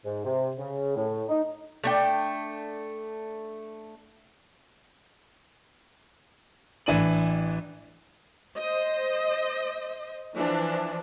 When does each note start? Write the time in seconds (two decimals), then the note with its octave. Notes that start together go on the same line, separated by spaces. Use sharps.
0.04 G#2
0.24 C3
0.58 C#3
0.96 A2
1.29 D#4
1.84 A3 D4 G5
6.86 A1 E3 D4 D#7 F#7
8.57 C5 D#5
10.35 E3 F3 D4